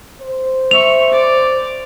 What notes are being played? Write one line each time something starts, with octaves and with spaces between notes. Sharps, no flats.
C5
E5 C#6 F7
D5